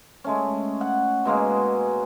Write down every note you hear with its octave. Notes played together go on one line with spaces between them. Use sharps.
G#3 A3 C#4
F#5
B2 G#3 A#3 G#4